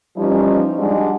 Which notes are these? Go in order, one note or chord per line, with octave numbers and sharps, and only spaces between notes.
E3 F3 G3 C#4 D#4
G3 G#3 D4 F#4